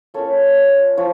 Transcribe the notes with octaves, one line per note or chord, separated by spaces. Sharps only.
A#3 C#4 F4 A4 C#5
F3 C#5